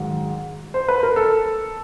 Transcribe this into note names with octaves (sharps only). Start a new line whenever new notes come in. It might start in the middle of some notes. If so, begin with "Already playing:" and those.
Already playing: G#2 D#3 F#3
C5
B4
A#4
A4